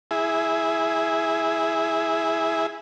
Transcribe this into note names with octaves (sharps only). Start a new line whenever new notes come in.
E4 G#4